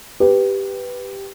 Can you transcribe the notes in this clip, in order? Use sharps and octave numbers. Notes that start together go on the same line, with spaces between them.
G4 B4